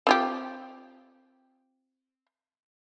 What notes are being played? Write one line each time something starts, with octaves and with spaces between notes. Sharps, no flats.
C4 F4 G4